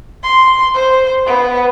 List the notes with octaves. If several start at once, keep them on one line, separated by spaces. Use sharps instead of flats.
C6
C5
B3